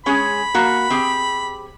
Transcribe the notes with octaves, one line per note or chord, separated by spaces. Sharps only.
G#3 C#4 G#4 B5
A#3 F#4
C4 G4 G#4